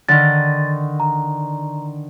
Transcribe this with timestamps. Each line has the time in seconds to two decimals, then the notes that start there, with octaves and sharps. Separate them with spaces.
0.08 D3 D#3 A6
1.00 A#5